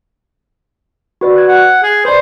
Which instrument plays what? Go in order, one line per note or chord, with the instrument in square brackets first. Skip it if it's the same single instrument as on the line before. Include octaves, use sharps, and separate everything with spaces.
[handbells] F#4 B4 D5
F#6 G#6
[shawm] F#5
G#4
[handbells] B4 D5 [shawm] C5